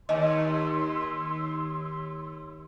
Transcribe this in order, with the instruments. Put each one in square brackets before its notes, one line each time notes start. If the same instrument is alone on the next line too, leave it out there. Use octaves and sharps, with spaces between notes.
[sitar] D#2 [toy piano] D#5 G#5 [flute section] C6 E6